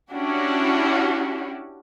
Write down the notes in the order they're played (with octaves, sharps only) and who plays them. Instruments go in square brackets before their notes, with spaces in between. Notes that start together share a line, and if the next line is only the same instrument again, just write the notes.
[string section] C#4 D4 E4 F#4 G4